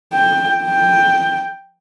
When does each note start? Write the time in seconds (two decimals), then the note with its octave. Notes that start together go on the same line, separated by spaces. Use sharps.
0.13 G5
0.64 G5